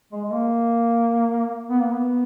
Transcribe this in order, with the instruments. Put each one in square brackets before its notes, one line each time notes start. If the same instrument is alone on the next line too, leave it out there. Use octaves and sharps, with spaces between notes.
[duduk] G#3
G#3
A#3
B3
A#3
B3